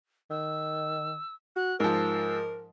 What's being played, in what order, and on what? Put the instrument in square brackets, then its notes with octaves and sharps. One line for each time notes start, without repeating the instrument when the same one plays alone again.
[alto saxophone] D#3 [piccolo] E6
[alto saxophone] F#4 [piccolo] F#6
[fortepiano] G#2 F3 [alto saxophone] A#4 [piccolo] E6